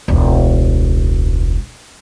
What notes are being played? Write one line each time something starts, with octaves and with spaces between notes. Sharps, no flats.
E1 C#2